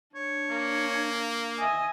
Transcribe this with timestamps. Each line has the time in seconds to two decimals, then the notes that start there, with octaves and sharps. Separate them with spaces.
0.15 D4 C#5
0.51 A#3
1.58 D#5 E5 G#5